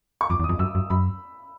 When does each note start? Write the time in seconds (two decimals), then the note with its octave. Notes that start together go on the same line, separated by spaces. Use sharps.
0.21 C#6
0.30 F2 D6
0.40 E2
0.44 D#6
0.49 F2
0.59 F#2 E6
0.75 F#2
0.90 F#2 B5